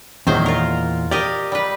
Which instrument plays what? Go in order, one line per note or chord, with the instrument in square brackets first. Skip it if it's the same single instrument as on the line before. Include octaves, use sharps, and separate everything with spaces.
[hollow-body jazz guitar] E2 A#2 [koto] D#3 F#3 C5
[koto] F4 A#4
[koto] G4 A#4 D#5 [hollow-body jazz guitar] D5
[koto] G3 B4